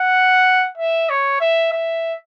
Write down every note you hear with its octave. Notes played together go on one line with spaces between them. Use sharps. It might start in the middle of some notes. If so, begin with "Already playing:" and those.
Already playing: F#5
E5
C#5
E5
E5